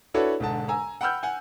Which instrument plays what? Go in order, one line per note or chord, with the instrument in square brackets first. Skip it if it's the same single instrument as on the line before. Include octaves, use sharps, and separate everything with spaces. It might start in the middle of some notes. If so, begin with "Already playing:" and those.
[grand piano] D4 E4 F#4 A4 B4 C#5
E1 G#2 D3 A5
G#5 A#5 E6
F#5 G5 B5 E6 F6 G6
F#5 G#5